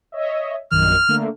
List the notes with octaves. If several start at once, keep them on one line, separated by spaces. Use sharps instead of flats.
C#5 D#5 E5
A#1 F#2 D#3 F6
D3 A3 A#3